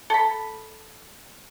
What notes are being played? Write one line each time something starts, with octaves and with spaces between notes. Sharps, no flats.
A4 B5